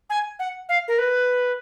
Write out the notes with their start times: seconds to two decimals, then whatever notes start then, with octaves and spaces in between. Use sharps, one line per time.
0.10 G#5
0.39 F#5
0.69 F5
0.88 A#4
0.99 B4